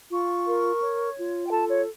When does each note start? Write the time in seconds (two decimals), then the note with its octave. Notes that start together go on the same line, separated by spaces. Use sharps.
0.11 F4 C#6
0.47 A#4
0.82 C#5
1.17 F4
1.47 G5
1.52 A4 A5
1.69 C#5